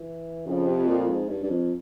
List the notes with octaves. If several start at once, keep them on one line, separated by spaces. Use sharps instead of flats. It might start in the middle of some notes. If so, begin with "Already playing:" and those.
Already playing: E3
F2 C#3
C3
A#2
G#2
G2
G2
F2